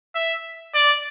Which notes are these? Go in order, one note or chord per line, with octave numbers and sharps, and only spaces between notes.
E5
D5